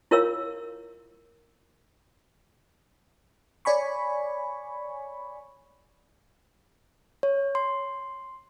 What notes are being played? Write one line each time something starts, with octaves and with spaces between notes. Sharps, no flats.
E4 F4 A#4 C#5 F5 E6
C#5 D5 G#5 B5 C#6
C#5
C6